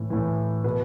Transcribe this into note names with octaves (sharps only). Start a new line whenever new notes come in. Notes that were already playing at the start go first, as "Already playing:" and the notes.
Already playing: A2 E3
A2 E3
B2 B4